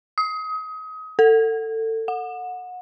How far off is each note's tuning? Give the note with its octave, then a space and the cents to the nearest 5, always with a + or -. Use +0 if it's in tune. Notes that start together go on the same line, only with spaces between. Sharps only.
D#6 +30
A4 +25
F#5 -25